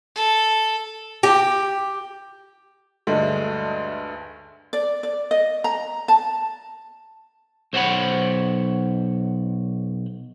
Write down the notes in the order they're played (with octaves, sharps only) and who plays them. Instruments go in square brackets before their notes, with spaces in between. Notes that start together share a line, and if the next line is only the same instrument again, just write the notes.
[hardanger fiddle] A4
[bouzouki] G4
[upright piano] D2 G2 G#3 A3
[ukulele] D5
D5
D#5
A#5
A5
[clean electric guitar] B1 C5 C#5 F5 F#5 B5